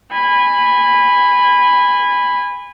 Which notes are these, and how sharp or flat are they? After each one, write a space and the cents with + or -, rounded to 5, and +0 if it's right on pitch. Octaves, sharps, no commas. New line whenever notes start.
G#5 -25 B5 +0